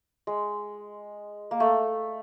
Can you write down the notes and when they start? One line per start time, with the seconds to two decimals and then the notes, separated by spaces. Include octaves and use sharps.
0.27 G#3
1.51 A#3
1.60 A3